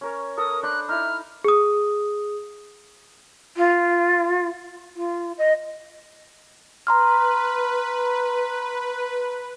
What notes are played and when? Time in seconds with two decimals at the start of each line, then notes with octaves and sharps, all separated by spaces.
0.01 C#4 A#4 C#5
0.38 A4 A#4 D#6
0.63 D4 C5 B5 F#6
0.89 D#4 E4 B5 F6
1.44 G#4 D#6
3.57 F4
4.96 F4
5.38 D#5
6.87 B4 A#5 C6 F6